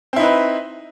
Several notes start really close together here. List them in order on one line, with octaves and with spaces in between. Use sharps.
C4 E4 D#4 B4